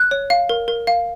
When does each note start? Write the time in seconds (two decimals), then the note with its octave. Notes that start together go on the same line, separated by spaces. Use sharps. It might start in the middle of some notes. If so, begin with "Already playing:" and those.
Already playing: F#6
0.11 C#5
0.30 F5
0.49 A#4
0.68 A#4
0.87 F5